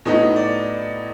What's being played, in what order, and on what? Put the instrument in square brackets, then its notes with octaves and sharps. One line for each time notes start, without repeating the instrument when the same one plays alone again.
[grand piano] A2 F#3 B3 D#4 D#5
D5